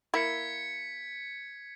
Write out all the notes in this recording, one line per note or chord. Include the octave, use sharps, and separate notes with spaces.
A#3 E4 G#6 B6 C#7